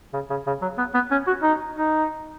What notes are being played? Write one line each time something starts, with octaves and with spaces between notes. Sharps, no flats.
C#3
C#3
C#3
F#3
B3
B3
C#4
F#4
D#4
D#4